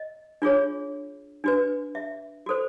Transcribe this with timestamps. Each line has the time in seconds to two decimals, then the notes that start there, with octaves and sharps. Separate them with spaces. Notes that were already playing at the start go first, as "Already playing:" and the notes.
Already playing: D#5
0.42 D4 F4 G#4 C#5
1.44 D4 F#4 B4
1.95 E5
2.46 F#4 A4 C5